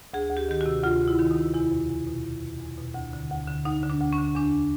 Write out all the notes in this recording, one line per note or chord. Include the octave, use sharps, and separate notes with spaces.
D2 G#4
D2
G4
D#3 G4
F#4
C3
D2 F4
D2
E4
D#3
D#4
C3
E2 E4
B2
E2
B2
E2
B2
E2
B2
D2
D3
D2
D3
D2 D#4
D3
D4
D2
C#4
D3
E2 D4